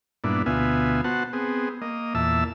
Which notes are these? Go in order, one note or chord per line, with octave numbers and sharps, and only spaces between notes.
G2 A#2 B3 D4 E4
D2 B2 B3 F4 E5 G#5
B3 F#4 C5 F#5 A5
B3 C4 G#4
A#3 D#5
E2 A#2 E5 A5 E6